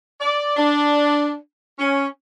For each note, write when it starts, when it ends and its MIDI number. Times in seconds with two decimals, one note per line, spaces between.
0.20 0.55 74
0.57 1.35 62
1.79 2.07 61